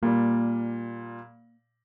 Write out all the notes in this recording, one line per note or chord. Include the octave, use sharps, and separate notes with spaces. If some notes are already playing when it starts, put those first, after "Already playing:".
A#2 G3 A#3